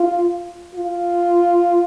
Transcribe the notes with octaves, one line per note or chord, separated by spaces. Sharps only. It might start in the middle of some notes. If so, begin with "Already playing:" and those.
Already playing: F4
F4